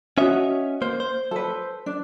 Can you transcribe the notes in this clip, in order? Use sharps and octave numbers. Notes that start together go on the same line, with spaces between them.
C#4 F#4 C#5 D#5 E5
A#3 C5
C5
A4 B4
D4